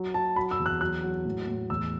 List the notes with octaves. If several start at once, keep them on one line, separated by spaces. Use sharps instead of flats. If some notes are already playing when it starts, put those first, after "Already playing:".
Already playing: F#3
F#3 A5
F#3 B5
E6
E2
F#6
F#3 F#6
F#3
A2
A2
E2 E6